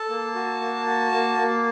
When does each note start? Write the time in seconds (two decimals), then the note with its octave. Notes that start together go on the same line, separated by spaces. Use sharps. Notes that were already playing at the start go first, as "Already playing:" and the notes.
Already playing: A4 A5
0.09 A#3
0.35 F#4
0.61 A#3
0.86 F#4
1.12 A#3
1.37 A#3